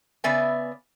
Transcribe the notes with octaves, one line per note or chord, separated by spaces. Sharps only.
C#3 B3 D5 E5 G#5